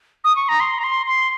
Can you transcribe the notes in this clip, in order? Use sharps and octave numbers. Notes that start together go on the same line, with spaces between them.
D#6
C#6
A#5
C6
A#5
C6
C6